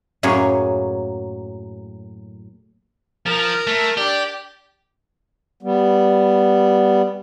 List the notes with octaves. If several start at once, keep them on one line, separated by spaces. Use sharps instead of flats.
F#2 A2 F#3 A#3 G#4 C#5
F3 A#4
A3
D4 G4 D5
G3 B3